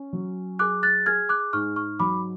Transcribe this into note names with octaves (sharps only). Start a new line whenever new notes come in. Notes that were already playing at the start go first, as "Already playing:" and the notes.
Already playing: C#4
F#3
G#4 D6 F#6
F#6 A6
G#4 F6 G#6
D6 F#6
G#2 C#6 F6
C#6 F6
F#3 B5 D6